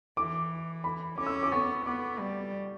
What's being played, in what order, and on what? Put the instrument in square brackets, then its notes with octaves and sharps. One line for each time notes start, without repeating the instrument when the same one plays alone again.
[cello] E3 [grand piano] D6
[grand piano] B5
[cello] C#4 [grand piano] D6
[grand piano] E6
D6
[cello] B3 [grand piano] C#6
[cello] B3 [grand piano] D6
[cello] G3